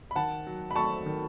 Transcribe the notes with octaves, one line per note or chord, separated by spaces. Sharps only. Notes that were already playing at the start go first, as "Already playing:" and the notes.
B5
D#3 F#5 A5
F#3
B5
A3 A5 C#6
D#3